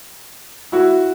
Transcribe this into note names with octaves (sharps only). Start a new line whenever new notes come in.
E4 F#4